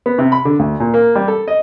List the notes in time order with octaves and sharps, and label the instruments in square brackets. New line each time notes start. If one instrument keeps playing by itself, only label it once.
[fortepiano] B3
C3
B5
D3
D2
A#2
A#3
G3
A4
D#5